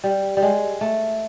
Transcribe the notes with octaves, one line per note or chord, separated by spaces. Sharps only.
G3
G3
G#3
A3